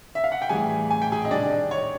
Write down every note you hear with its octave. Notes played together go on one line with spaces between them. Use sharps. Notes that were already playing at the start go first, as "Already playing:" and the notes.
E5
F5
F#5
G5
A2 E3 G3 G#4 G#5
G#5
G5
G#4 G#5
D#5
C3 D#3 G3 D4 D5
C#5